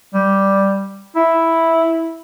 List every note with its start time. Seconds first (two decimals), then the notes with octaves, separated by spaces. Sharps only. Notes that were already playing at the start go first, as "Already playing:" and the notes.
0.14 G3
1.16 E4